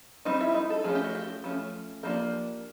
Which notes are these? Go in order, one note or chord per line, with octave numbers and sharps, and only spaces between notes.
G3 C4 D#4
E4
D#4
A4
F3 A3 C#4 G#4
G4
F#4
G4
F3 A3 C#4
F3 A#3 D4 G4